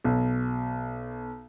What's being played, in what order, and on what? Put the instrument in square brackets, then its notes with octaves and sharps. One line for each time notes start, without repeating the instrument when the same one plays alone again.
[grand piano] B1